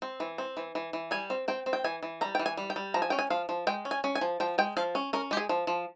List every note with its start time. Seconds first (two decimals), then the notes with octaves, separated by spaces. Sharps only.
0.02 C4
0.20 E3
0.38 C4
0.57 E3
0.75 E3
0.93 E3
1.11 G3 G#5
1.30 C4
1.48 C4 G5
1.66 C4
1.73 G5
1.84 E3 G#5
2.03 E3
2.21 G3 A#5
2.35 E3 G5
2.46 G#5
2.57 G3
2.70 G5
2.76 G3
2.94 F3 A#5
3.02 G#5
3.10 C#4 G5
3.19 G#5
3.30 F3 F5
3.49 F3
3.67 G#3 G5
3.85 C#4
3.91 G#5
4.04 C#4
4.15 G#5
4.21 F3
4.40 F3 G5
4.58 G#3 G5
4.77 F3 F5
4.95 C#4
5.13 C#4 A#4
5.31 G#3 G4
5.37 G#4
5.49 F3
5.67 F3